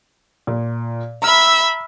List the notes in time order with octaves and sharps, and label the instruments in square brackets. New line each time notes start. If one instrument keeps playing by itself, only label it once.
[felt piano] A#2
[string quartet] E5 B5 E6 [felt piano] A#5 F6